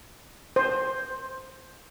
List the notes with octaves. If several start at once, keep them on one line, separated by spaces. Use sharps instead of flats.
C5